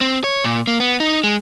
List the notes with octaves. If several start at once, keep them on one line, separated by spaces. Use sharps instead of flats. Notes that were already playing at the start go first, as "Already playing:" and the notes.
C4
C#5
A#2
A#3
B3
D#4
G#3